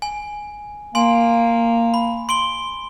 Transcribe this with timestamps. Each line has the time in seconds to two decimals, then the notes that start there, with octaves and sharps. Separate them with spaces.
0.02 G#5
0.95 A#3 G#5 C6
1.94 B5
2.29 C6 D7 G7